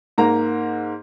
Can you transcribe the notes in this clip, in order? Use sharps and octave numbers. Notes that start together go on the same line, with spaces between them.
G#2 A#3 A#5